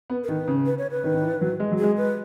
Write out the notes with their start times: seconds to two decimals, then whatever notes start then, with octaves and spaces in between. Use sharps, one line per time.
0.10 B3
0.24 A#4
0.28 D#3 B4
0.48 C#3
0.66 B4
0.78 C#5
0.91 B4
1.04 D#3
1.14 D#3
1.22 E3
1.41 F#3
1.60 G#3
1.72 F#3
1.78 G#4
1.83 G#3
1.97 B4